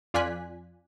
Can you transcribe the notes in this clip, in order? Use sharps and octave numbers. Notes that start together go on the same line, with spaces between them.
F2 F4 D5 G#5 F#6 B6